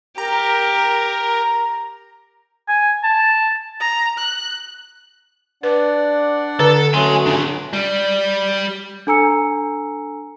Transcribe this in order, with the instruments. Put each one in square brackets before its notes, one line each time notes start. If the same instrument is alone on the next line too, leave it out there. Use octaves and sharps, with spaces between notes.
[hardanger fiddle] G4 [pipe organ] A#4 [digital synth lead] A#5
[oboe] G#5
A5
[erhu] A#5
F#6
[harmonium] D4 D5 F#5 [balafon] B4
[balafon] D3 [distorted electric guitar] A4
[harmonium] F#3 A3 C#4 [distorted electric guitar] G#5 C6
[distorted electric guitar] D4 F4
G3
[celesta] D4 A4 G#5 A#5 E6 C#7